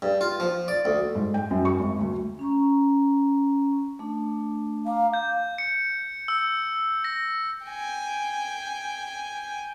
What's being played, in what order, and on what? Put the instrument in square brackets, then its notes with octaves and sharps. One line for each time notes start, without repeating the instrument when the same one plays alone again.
[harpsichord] G2
F4
F3
D5
D2
[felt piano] G#2
G5
F#2
C#6
G#1
D2
[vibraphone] C#4 A#5 C#6
A3 D4
[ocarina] F5 [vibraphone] A#5 D6
[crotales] G6
C#7
E6
A#6
[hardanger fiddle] G5 G#5